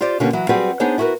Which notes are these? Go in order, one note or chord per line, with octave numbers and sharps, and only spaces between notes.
F4 G4 C5 D5
B2 D3 A#3 C#4 F4 G4
E3 F#3
F#3 G3 C4 F#4 G#4 B4
B3 D4 D#4 G#4 C5 C#5
E4 F#4 G#4 A#4 B4